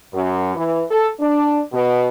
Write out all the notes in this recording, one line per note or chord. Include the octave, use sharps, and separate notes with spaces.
F#2
E3
A4
D4
B2